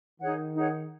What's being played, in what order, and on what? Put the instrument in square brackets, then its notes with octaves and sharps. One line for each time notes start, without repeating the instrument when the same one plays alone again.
[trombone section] D#3 [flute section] D#4 G#4 C#5 F#5
[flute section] D#4 G#4 C#5 F#5